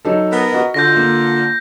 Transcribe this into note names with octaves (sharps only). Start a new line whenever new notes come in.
F#3 D#4 A4
B3 A#4
F#4 D#5
D3 F4 G6 A#6
A#3